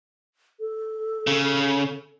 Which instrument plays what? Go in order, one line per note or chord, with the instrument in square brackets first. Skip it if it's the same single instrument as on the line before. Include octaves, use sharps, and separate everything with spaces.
[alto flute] A4
[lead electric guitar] C#3